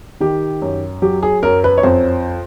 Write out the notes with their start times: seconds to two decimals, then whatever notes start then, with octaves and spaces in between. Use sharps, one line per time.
0.21 D#3 G4
0.62 F#2
1.02 F#3 G4
1.23 G#4
1.43 F#2 A#4
1.64 B4
1.78 C#5
1.83 F2 C5